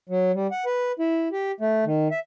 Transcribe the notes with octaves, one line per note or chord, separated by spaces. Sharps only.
F#3
G3
F#5
B4
E4
G4
A3
D#3
E5